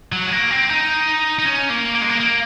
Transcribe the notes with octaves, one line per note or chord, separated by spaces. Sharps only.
F#3
G#3
A#3
C4
D#4
D#4
C#4
A#3
A#3
G#3
A#3
A#3